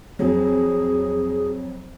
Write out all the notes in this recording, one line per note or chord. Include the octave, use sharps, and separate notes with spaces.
F2 F#3 G#4